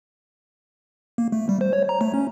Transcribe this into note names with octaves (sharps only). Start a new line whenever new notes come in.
A#3
A3
G3
C5
C#5
A#5
A3
C#4